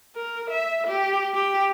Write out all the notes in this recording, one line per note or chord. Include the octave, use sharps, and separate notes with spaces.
A#4
E5
G4
G4